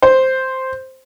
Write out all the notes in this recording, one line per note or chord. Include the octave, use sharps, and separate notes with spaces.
C5